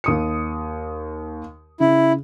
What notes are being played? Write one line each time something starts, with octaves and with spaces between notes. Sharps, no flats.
D#2 D#6 C#7
C#3 E4